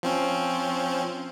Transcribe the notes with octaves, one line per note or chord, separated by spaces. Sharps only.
F3 C4 C#4